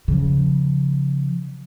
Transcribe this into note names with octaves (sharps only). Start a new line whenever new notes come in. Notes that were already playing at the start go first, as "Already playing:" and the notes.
C#3 F3